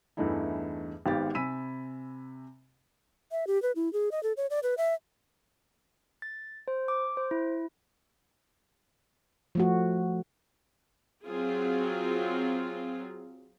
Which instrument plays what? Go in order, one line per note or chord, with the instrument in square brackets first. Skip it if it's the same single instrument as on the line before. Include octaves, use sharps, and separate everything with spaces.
[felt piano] E2 G2 E3 A3 D#4 E4
G#1 G#2 B3 G4 F5 A6
C3 G#5 B5 E6 B6 D#7
[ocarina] E5
G4
B4
E4
G#4
D#5
A4
C#5
D5
B4
E5
[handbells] A6
C5
D6
C5
E4
[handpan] F3 A3 F#4
[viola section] F#3 C4 F4 G#4